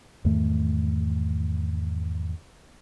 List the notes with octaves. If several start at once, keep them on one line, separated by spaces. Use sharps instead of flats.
E2 G#2 D#3 A3